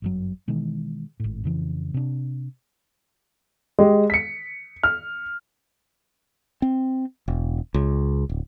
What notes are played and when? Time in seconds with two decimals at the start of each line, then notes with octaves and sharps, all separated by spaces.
0.02 G1 F#2 F#3
0.48 B2 D#3 E3 G#3
1.20 G#1 A2
1.44 F2 C#3 E3
1.94 C3 D4
3.79 G#3 G4
4.10 B6 C#7
4.83 F6
6.62 C4
7.28 E1
7.74 C#2
8.29 D1